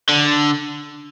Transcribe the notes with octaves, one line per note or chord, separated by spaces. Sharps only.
D3